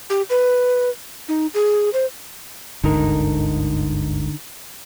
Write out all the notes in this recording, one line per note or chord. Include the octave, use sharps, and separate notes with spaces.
G4
B4
D#4
G#4
C5
G1 D2 G#2 D3 D#4 A#4